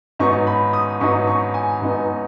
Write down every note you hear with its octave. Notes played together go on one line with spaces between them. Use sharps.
G#2 F#3 B3 D#4 C#6
B5
D#6
G#2 F#3 B3 D#4 C#6
C#6
G#5
G#2 F#3 B3 D#4